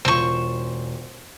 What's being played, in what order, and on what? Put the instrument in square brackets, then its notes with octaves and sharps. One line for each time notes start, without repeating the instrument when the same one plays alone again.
[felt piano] E1 F4 [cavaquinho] C5 C#6